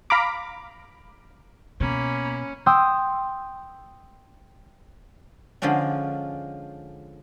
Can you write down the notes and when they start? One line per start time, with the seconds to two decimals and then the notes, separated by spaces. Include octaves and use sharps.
0.10 F5 A#5 B5 D6
1.80 B2 A#3 C#4 B5
2.66 G5 C6 D#6 E6 G6
5.62 D3 F3 G#3 C#4 D4